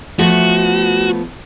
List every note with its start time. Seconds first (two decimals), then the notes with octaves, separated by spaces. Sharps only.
0.19 F3 A3 B3 F#4